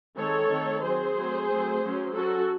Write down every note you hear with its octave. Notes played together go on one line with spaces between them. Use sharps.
D#3 G#3 C4 A4 C#5
D#3 A3 C4
F#3 C4 G#4 C5
F#3 A3 C4
F#3 A3 C4
F#3 C#4
F#3 C#4 F#4 A4